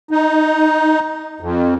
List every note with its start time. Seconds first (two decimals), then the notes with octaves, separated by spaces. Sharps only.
0.11 D#4
1.41 F2